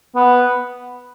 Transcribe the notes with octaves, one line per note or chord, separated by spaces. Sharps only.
B3